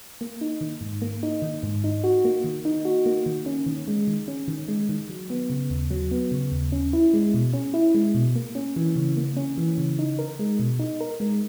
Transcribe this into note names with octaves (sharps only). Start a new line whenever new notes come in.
A#3
D#4
D#3
G#2
A#3
D#4
D#3
G#2
D#4
F#4
A#3
D#3
D#4
F#4
A#3
D#3
C#4
D#3
G#3
D#3
C#4
D#3
G#3
D#3
F#3
B3
C#3
D#2
F#3
B3
C#3
D#2
C#4
E4
G#3
B2
C#4
E4
G#3
B2
A#3
C#4
E3
C#3
A#3
C#4
E3
C#3
D#4
A#4
G#3
B2
D#4
A#4
G#3